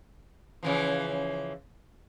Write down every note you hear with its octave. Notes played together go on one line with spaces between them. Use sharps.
C#3 E3 F3